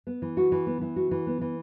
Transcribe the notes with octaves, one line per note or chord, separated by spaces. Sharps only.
B3
E3
F#4
E3
B3
E3
F#4
E3
B3
E3